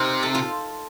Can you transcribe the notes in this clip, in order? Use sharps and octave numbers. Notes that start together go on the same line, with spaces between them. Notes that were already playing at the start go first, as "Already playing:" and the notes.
Already playing: C3 D#4 A#4 C5
A4
F4